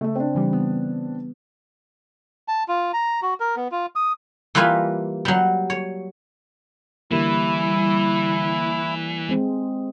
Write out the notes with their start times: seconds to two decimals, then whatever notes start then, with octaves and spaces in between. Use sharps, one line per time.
0.01 C#3 A3 E5
0.15 C4 D4
0.35 C#3 E3 G3
0.53 B3
2.48 A5
2.68 F4
2.93 A#5
3.22 F#4
3.40 A#4
3.56 B3
3.72 F4
3.96 D#6
4.55 E3 G3 A#3 F4 B4 G#5
5.25 F#3 G3
5.70 C#5
7.11 D3 E3 G3 A#3 E4
9.29 G#3 C4